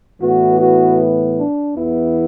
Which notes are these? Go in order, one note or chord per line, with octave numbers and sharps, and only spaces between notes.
A2 E3 B3 F#4
F#4
D4
E2 E3 B3 E4